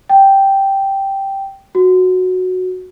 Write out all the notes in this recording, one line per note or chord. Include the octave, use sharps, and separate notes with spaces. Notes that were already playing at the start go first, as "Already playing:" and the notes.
G5
F#4